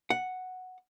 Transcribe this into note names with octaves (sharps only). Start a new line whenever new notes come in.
F#5